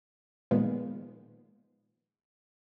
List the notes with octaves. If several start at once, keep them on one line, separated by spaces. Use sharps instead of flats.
A#2 D#3 F3 G#3 B3